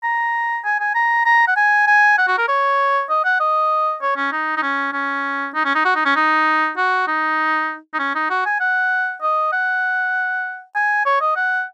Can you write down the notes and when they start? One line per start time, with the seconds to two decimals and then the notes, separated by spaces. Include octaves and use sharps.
0.03 A#5
0.64 G#5
0.80 G#5
0.95 A#5
1.26 A#5
1.48 F#5
1.57 G#5
1.87 G#5
2.18 F#5
2.28 F#4
2.38 A#4
2.49 C#5
3.10 D#5
3.25 F#5
3.40 D#5
4.02 C#5
4.17 C#4
4.32 D#4
4.57 D#4
4.63 C#4
4.93 C#4
5.55 D#4
5.65 C#4
5.75 D#4
5.85 F#4
5.96 D#4
6.05 C#4
6.16 D#4
6.77 F#4
7.08 D#4
7.94 D#4
7.99 C#4
8.15 D#4
8.30 F#4
8.46 G#5
8.60 F#5
9.22 D#5
9.53 F#5
10.75 G#5
11.06 C#5
11.21 D#5
11.36 F#5